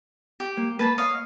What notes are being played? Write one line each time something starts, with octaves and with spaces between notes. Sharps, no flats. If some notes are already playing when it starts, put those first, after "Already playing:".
G4
A#3
A#3 B4 A5 B5
C#5 D#5 F5